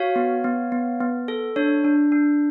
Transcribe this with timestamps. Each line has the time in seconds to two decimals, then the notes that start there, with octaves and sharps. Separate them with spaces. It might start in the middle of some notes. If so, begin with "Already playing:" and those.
Already playing: F#4 C#5 F5
0.16 B3
0.44 B3
0.72 B3
1.01 B3
1.28 A4
1.56 D4 C#5
1.84 D4
2.12 D4